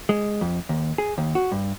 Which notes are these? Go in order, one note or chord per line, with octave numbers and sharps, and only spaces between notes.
G#3
F2
D#2
G#4
D#2
F#4
G2